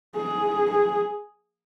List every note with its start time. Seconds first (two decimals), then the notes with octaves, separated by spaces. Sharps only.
0.16 G#4
0.71 G#4